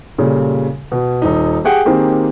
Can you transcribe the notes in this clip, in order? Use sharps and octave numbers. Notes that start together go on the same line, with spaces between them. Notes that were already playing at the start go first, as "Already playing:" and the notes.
A#2 C#3 G3 A4
B2
D#1 D#4
G4 G#4 F#5 G5
D#3 A#3 C4 G4 G#4